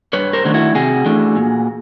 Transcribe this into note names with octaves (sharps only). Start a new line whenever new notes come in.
G2 B4 C#5
A#4 C5
D#3 F#3 A3 D4
E4 F#4
C3 F#4 G#4
E3 A3 D4
A#2